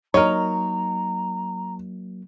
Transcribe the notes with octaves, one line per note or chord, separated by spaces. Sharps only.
F#3 A#3 D#4 A#4 C#5 A#5